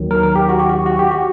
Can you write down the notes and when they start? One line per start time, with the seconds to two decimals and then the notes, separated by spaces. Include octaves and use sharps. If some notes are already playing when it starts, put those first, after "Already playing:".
Already playing: D#2 D#3 F#3
0.11 A#4
0.23 A#4
0.36 G4
0.49 F#4
0.59 G4
0.69 F#4
0.86 F#4
0.99 G4
1.11 F#4